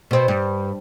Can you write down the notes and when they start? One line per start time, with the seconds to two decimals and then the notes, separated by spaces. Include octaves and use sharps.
0.11 B2 C4
0.28 G2